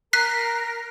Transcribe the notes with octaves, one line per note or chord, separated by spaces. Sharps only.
A#4 A#5 F#6 B6 C7